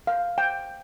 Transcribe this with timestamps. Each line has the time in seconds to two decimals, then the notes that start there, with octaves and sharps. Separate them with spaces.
0.07 F5
0.38 G5